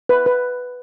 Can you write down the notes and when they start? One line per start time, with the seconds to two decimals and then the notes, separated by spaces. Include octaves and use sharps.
0.09 B4
0.26 B4